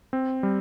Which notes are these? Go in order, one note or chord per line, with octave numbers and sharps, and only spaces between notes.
C4
G3